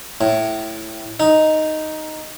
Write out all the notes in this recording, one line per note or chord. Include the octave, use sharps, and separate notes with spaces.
A2
D#4